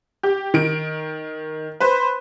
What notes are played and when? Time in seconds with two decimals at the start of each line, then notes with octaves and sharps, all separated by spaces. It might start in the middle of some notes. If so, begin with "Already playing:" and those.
0.23 G4
0.54 D#3 D7
1.80 B4 C5